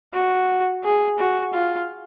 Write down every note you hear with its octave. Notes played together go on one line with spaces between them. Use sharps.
F#4
G#4
F#4
F4